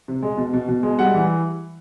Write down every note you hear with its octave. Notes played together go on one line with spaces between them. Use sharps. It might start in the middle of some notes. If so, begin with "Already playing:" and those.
C3
G#3
B2
B2
B2
G#3
G3 F#5
E3